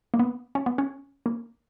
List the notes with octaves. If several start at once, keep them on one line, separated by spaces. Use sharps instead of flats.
A#3
B3
C#4
B3
C#4
A#3